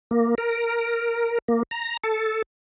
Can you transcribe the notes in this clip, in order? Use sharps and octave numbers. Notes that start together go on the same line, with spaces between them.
A#3
A#4
A#3
A#5
A4